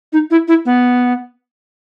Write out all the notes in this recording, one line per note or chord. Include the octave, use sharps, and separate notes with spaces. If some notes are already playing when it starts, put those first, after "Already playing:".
D#4
E4
E4
B3